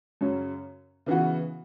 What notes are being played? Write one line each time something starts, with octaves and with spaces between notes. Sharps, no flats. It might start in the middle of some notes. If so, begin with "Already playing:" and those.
F#2 C#3 F#3 C#4
C#3 E3 B3 F#4